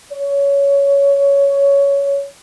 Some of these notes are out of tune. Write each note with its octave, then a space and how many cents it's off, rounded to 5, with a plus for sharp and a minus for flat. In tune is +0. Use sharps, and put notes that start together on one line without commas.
C#5 +15